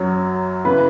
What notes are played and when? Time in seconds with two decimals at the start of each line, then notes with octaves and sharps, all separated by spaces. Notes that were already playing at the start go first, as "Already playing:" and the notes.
Already playing: F#2 F#3 C#5
0.64 C#3 E3 B4 B5